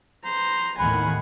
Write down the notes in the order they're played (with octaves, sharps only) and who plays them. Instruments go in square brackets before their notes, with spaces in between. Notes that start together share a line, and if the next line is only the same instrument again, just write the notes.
[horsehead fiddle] B4 A#5 [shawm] C5
[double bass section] D#2 A2 D#3 [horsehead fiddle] B3 G#5 [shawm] F#5 [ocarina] B5